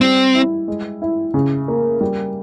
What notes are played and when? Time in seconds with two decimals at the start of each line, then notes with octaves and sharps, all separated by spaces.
0.01 G3 C4
0.35 E4
0.68 G#3
1.02 E4
1.34 C#3
1.68 A#3
2.01 G3